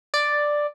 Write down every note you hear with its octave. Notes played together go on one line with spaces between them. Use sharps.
D5